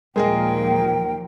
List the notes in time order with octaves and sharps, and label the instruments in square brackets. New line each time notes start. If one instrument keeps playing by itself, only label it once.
[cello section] D#2 A#2 F3 [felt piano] G#3 G#4 D#5 [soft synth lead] A#4 [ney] G5